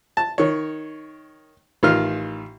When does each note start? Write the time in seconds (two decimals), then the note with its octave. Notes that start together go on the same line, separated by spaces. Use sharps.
0.17 A5
0.38 D#3 C#5
1.83 A1 D#3 F4 F6